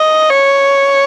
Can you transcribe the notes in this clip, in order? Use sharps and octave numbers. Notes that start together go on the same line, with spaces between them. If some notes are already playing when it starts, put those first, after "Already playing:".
Already playing: D#5
C#5